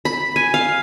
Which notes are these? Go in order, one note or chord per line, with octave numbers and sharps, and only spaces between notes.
B5
G#5
F5